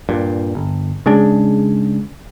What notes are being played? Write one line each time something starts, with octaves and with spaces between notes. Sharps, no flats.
G2 A#2
G1
C#3 G#3 D4